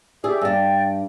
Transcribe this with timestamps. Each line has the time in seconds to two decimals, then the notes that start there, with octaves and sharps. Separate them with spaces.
0.24 G4 G#4 D5 E5 E6
0.41 G2 D4 D5 G5